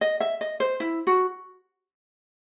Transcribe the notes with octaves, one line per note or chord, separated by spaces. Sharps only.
D#5
E5
D#5
C5
E4
F#4